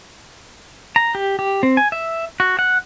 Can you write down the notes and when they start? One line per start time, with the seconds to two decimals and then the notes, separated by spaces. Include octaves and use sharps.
0.96 A#5
1.15 G4
1.39 G4
1.63 C4
1.77 G#5
1.92 E5
2.40 F#4
2.59 F#5